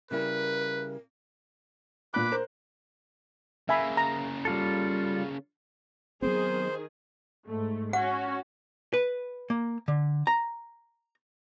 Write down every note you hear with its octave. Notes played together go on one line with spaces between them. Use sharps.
C#3 G3 E4 A#4 B4
A#2 B4 B5 D6 F#6
A#4 C5
C#3 A#3 E5 G#5 B5
A#5
G3 F4 A4
D#3 F#3 B3 C4 G#4 C5
G#2 A3
C#4 F#4 F#5
B4
A#3
D3
A#5